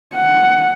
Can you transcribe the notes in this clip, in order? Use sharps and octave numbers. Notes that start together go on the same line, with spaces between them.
F#5